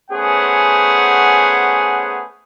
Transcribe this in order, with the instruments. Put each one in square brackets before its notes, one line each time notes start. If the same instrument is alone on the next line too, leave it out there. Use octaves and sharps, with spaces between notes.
[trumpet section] A3 B3 C#4 G#4 C5 F#5